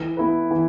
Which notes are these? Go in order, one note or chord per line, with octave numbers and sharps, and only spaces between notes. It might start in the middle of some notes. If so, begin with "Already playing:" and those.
Already playing: E3
B3 E4 B4
E3